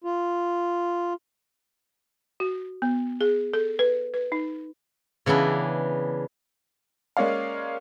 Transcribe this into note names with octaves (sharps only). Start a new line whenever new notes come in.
F4
F#4
B3
G#4
A4
B4
B4
D#4
C#3 E3 B3 D4 E4
G#3 A#3 C#4 D5 F5